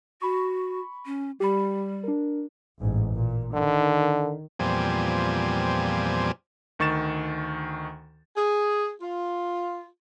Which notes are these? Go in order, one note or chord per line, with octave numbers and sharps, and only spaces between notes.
F#4 B5 C#6
C#4
G3 G4 B5
D4 A#4
A1 G#2
A#2
D3 D#3
E2 A#2 F3 G3 C4 G#5
D2 D#3 C#6 A6 E7
G#4
F4